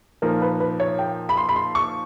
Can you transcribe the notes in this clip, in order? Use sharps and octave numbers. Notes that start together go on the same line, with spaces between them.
A#2 F3 A#3 D#4 A#4
B4
B4
C#5
G5
B5
C6
B5
C6
C#6